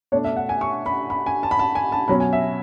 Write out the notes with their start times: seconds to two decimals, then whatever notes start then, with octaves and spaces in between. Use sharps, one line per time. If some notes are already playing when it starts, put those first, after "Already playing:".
0.12 B2 A3 D4 C#5
0.24 E5
0.36 F#5
0.49 G#5
0.61 C#6
0.86 B5
1.10 B5
1.26 G#5
1.43 A5
1.51 B5
1.59 A5
1.75 G#5
1.92 A5
2.08 B2 F#3 C#4 B5
2.20 G#5
2.33 E5